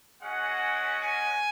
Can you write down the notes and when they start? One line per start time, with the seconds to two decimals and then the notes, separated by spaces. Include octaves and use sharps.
0.22 G#3 C#4 F#4 F#5
1.01 G#5